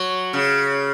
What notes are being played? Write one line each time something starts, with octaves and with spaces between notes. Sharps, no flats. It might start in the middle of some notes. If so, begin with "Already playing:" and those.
Already playing: F#3
C#3